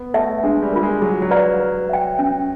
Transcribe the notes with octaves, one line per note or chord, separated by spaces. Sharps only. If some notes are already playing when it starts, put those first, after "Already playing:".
Already playing: B3
A3 B4 E5 A5
G#3 D4
G3
F4 A#4
G#3
F#3 G#4
F#3
B4 D5 F5 A#5
B4
E5 G5
C#4